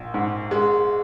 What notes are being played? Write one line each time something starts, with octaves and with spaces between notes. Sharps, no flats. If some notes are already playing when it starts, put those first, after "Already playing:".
Already playing: A#1
G#2
G#3